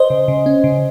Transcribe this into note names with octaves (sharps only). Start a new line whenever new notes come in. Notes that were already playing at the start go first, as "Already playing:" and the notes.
Already playing: C5 D#5
C#3
C#3
C#4
C#3